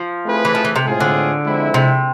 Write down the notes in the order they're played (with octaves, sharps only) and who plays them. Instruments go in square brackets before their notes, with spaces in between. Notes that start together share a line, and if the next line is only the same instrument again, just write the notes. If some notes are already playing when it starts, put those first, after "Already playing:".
Already playing: [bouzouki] F3
[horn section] A3 C4 E4 G#4 B4
[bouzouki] E3
F3
E3
C3
[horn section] A2 G#3 C4 F4 G#4
[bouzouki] D3
[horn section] F3 G#3 C4 E4
[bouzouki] C3